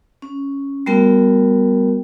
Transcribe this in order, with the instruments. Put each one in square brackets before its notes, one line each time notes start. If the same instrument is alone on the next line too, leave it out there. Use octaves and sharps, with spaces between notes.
[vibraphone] C#4
G3 A3 B3 F#4 A#4 G5